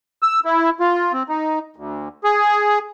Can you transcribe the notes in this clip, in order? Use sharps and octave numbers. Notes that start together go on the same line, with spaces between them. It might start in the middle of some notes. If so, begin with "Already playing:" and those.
E6
E4
F4
C4
D#4
D2
G#4